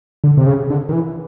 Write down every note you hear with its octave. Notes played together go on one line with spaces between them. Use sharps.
D3
C3
C#3
D3
D#3
E3